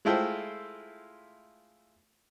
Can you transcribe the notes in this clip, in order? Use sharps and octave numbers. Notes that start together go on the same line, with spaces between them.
G#3 A3 E4 F4 C5 G5